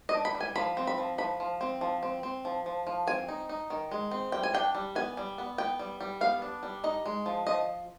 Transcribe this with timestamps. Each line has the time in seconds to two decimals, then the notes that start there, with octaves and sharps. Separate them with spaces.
0.09 D#5
0.14 D4
0.25 B5
0.34 G3
0.41 G#5
0.55 F3 B5
0.77 C4
0.87 B5
0.98 F3
1.18 F3 B5
1.40 F3
1.61 C4
1.81 F3
2.03 C4
2.23 C4
2.45 F3
2.66 F3
2.87 F3
3.07 C4 G#5
3.28 D#4
3.49 D#4
3.70 D#3
3.91 G#3
4.11 C4
4.32 G3 G5
4.43 G#5
4.54 D4 G5
4.75 G3
4.95 B3 G#5
5.17 G3
5.38 B3
5.58 B3 G5
5.79 G3
6.00 G3
6.21 B3 F5
6.42 D4
6.63 G3
6.84 D#4 D#5
7.06 G#3
7.26 F3
7.47 F3 D#5